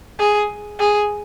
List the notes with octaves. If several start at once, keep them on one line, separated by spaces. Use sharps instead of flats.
G#4
G#4